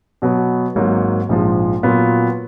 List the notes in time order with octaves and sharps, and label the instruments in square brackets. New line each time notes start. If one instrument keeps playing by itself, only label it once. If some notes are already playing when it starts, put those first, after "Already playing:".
[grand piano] B2 F#3 B3
G#1 G#2 F#3 A#3
A#1 G#2 F3 G#3
A#2 F#3 B3 F4